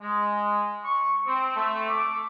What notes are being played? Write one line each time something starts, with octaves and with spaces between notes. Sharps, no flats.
G#3
C#6
C4
A3
D6